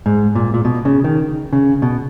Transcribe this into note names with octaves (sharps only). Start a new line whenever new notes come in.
G#2
A#2
A#2
B2
C#3
D#3
C#3
B2